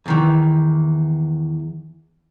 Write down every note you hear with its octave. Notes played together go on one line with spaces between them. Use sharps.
E2 D#3 E3